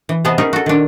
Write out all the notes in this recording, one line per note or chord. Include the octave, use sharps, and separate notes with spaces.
E3
C3 B3 G#4 D#5 A5
C#4 D#4 G#4 A#4
F#4 A4
D#3 D4